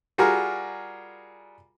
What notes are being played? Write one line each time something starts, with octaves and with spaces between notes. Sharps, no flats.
G3 F4 F#4 G#4 A#4